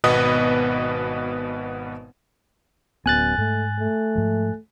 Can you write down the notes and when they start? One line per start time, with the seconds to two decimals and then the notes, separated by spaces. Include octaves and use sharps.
0.04 G#1 B2 B3 B4 D#5 D#6
3.06 D1 F#2 B3 G#5 F#6 A6
3.38 G#2 A3
3.79 A3
4.15 G#2 F3